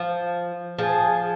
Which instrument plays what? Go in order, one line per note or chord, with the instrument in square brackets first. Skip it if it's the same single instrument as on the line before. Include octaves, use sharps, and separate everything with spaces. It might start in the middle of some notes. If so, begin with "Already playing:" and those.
Already playing: [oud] F3
[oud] F3 [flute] G#4